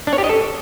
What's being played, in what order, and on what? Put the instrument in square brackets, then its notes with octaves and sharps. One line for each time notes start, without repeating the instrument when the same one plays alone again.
[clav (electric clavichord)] D4
C#5
G4
D#5
A4